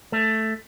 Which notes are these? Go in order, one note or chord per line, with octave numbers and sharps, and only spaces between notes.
A3